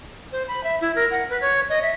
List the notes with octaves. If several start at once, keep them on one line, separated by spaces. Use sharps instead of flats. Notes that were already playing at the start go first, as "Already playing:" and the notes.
C5
B5
E5
E4
A#4
F#5
B4
C#5
D#5
E5